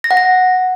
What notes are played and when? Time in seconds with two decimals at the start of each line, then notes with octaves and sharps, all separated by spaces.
0.04 A#6
0.11 F#5
0.17 A#6